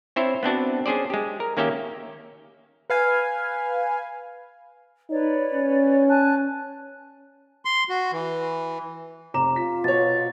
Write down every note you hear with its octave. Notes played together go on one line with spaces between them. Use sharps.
C4 D4 E4 C5 C#5 E5
B3 C4 D4 F#4
C#4 D4 G#4 C5 D5
G#3 G4
A#4
D#3 A#3 C#4 G4 E5 G5
B4 F5 G#5
D#4 B4 C#5 D5
C#4
G#5 A5 F#6
C6
F#4
E3
F1 A#5 D6 E7
F4 B6
B2 C#5 A6